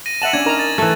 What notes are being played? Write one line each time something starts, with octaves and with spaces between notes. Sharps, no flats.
A#6 D#7
E5 F#5 A5 E7 F#7
C#4 D4 G#6
D#4 A#4 A#5
A6
E3 A3